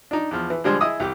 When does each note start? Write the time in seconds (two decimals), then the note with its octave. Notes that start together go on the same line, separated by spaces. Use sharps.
0.11 D4 D#4
0.31 E2 F3
0.50 E3
0.64 D3 F3 G3 G#3 G#4 C5
0.81 E4 G#4 D#5 D#6 E6
1.00 C2 G4 D6